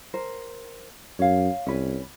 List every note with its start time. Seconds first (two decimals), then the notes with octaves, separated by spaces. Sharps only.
0.14 A#4 C5
1.19 F#2 C#5 F5
1.66 C2 C#4 B4